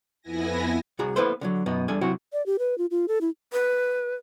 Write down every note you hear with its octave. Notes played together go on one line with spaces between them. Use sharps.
F2 B3 E4 G#5 A#6
C2 F#4 G#4 A#5
A#3 B3 E4 A4 B4 C5
D3 D#3 F#3
F#2 B2 B3 D#4
E2 G3 D4 A4 G#5
C3 F#3 E4 F#4
D5
G4
B4
F4
F4
A4
E4
B4